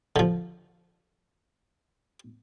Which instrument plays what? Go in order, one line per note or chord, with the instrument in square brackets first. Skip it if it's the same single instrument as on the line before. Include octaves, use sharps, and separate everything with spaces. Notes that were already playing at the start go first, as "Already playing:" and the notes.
[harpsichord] D3 F3